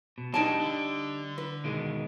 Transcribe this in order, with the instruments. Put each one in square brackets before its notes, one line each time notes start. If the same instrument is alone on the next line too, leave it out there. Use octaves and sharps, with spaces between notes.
[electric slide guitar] B2
[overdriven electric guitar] B2 G#3 [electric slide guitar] G3 D4 G4 [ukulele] D#4 G#5 A5
[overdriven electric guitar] D3
[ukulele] B4
[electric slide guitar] B2 D#3 G#3